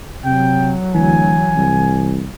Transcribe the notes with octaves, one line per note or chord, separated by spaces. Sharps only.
C3 F#3 G5
D2 E3 G#5
C2